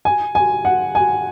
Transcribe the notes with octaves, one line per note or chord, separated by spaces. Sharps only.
G#5
G#5
F#5
G#5